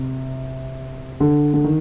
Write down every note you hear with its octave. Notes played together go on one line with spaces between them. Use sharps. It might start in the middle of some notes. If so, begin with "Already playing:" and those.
Already playing: C3
D3
D3
D#3